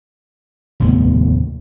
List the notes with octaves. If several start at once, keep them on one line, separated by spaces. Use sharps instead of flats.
F1 D#2 A2 B3